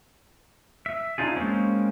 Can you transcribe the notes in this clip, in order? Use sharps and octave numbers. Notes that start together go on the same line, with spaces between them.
E5
D4 D#4 F4 G#4
G#3 A#3 C4 C#4